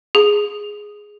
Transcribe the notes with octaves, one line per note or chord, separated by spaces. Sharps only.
G#4